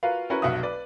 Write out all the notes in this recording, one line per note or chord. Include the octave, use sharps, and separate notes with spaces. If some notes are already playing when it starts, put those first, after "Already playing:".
F4 F#4 A#4 B4 F5
C#4 E4 F#4 A#4 B4
F1 B1 F#4 E5 F5 D#6
B4 D5